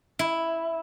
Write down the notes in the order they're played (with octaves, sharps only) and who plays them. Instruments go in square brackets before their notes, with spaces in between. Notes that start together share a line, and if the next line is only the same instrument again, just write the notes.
[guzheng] E4